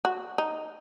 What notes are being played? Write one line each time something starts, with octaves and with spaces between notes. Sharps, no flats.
F#4
D#4